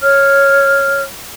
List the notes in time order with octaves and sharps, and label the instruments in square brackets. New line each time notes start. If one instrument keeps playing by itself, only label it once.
[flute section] C#5 F6